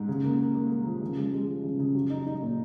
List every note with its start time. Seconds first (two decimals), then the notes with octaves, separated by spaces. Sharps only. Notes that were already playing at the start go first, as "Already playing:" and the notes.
Already playing: G#2
0.08 C#3
0.23 A#3
0.39 A#3
0.55 A#3
0.70 A#3
0.86 F3
1.02 C#3
1.17 G#3
1.33 G#3
1.48 F3
1.63 C#3
1.79 C#3
1.95 F#3
2.10 D#4
2.26 D#4
2.42 A#2